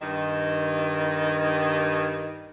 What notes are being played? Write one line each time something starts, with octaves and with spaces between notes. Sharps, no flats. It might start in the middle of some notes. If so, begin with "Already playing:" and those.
G2 D#3